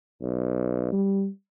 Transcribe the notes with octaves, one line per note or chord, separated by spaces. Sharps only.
B1
G3